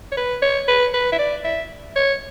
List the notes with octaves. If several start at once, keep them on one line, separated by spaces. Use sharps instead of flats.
C#5
B4
C#5
B4
B4
E5
D5
E5
C#5